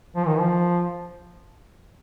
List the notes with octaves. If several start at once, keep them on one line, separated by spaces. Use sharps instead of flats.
F3
D#3
F3